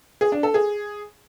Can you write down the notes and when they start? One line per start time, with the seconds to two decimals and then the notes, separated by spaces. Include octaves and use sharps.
0.21 G#4
0.32 D4
0.43 A4
0.54 G#4